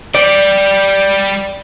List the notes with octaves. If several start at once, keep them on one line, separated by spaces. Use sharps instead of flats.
G3 G4 D5